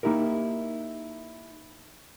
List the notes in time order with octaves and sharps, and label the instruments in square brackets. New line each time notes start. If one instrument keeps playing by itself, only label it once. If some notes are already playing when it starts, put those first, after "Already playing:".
[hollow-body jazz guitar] A#3 D#4 E4 G4 A#4